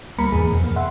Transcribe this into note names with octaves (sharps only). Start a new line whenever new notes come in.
D2 G3 A#3 A#5 B5 C#7
E2 G#2 G#4
F2 B2
A#3
E5 F#5 C6